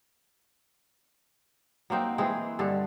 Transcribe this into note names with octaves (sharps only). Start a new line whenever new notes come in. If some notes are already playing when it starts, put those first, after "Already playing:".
F#3 A#3 C4 D#4
E3 G#3 C4 G#4
G2 D3 A4